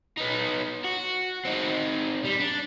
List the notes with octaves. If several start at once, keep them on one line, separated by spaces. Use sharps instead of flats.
B3 D#4
F#4
C4 D#4
G3
D4